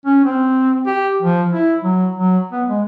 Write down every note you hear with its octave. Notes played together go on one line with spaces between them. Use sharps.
C#4
C4
G4
F3
E4
F#3
F#3
B3
G#3